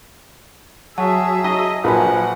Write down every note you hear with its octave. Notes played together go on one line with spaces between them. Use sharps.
F#3 G#4 E5 A5
F#3 D#5
A#1 F3 F#3 B4 F#5 G#5 B5